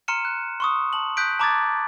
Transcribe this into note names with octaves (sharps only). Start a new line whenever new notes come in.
A#5 C6 F6 C#7 D#7 E7
F#6
C6 C#6 D#6
A5 F#7
D#6 F#6 G6 B6 D7
A5 A#5 D6 D#6 G#6 A6